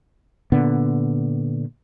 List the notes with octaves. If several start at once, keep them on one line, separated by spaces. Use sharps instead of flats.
A#2 D3 B3